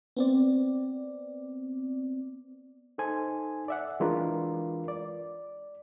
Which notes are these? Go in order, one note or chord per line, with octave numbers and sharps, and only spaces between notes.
B3 C4 D5
D#4 A4 C5 G#5
D5 E5 F#5
E3 G#3 D4 F4 A#4 B4
D5